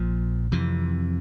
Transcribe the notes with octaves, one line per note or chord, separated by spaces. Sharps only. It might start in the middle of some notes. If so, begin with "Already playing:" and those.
Already playing: A#1 A#2 F3
F2 C3 E3